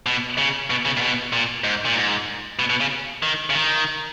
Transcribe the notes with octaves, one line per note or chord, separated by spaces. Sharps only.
B2
C#3
B2
C#3
A#2
B2
A#2
G#2
A#2
G#2
B2
B2
C#3
D#3
C#3
D#3